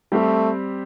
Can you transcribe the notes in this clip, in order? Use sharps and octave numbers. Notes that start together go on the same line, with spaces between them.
G3 A3 C4 G4